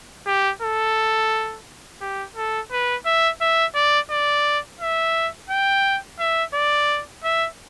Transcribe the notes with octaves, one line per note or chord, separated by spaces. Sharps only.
G4
A4
G4
A4
B4
E5
E5
D5
D5
E5
G5
E5
D5
E5